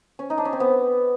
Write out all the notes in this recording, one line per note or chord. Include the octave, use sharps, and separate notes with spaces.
C#4
D#4
D4
C#4
C4
B3